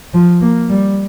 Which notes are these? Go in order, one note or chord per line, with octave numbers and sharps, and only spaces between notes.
F3
A#3
G3